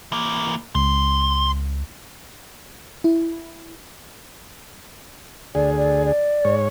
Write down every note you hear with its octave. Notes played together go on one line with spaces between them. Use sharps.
E3 A#3
C#2 C6
E4
D2 G#4 D5
D5
D5
G#2 C#5